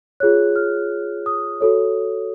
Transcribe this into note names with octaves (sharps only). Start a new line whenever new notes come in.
F4 G#4 C#5 F#6
F6
D#6
F#4 A4 C#5